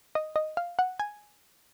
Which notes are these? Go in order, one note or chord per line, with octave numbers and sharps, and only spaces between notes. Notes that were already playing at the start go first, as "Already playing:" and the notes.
D#5
D#5
F5
F#5
G#5